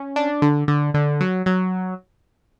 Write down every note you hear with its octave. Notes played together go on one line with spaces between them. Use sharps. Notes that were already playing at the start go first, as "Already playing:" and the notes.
Already playing: C#4
D4
D3
D3
D3
F#3
F#3